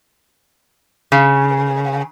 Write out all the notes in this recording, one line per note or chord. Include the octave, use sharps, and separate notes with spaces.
C#3